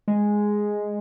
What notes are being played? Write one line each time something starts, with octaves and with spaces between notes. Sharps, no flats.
G#3